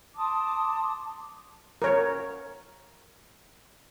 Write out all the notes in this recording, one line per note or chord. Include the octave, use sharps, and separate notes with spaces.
A5 C6 D6 D#6
A#4 C#5